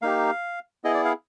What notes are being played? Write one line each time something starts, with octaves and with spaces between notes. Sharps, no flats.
A#3 D#4 G4 F5
B3 E4 G#4 D#5
D5
F5